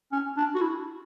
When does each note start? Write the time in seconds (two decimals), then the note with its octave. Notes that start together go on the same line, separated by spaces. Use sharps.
0.12 C#4
0.37 D4
0.55 F#4
0.61 E4